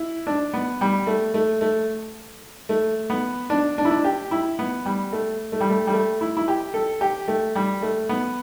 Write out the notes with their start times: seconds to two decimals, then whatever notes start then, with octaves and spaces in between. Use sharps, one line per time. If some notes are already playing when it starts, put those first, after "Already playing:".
Already playing: E4
0.27 D4
0.54 B3
0.81 G3
1.07 A3
1.34 A3
1.61 A3
2.69 A3
3.10 B3
3.50 D4
3.78 D4
3.85 E4
3.91 D4
4.04 G4
4.31 E4
4.59 B3
4.86 G3
5.12 A3
5.52 A3
5.61 G3
5.69 A3
5.87 G3
5.93 A3
6.21 E4
6.37 E4
6.48 G4
6.74 A4
7.01 G4
7.28 A3
7.55 G3
7.82 A3
8.09 B3